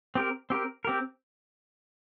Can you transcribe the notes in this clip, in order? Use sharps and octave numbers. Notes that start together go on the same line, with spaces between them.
C4 G4 A#4
C4 G4 A#4
C4 G4 A#4